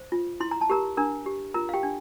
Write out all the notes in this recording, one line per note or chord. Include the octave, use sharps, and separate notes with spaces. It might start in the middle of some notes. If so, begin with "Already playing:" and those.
Already playing: C5
F4
E4 C6
A#5
A5
G4 A#4 A#5
D4 A#4 A#5
G4
F4 A#4 A#5
F5
G4 G5
D4